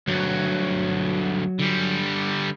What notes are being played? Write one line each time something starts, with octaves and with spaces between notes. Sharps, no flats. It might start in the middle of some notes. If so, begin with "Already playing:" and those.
D2 G2 F#3
D3 G3